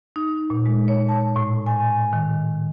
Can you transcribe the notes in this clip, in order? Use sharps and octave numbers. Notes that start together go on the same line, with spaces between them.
D#4
A#2
G#3
C#5
A5
A2
G#5
D#3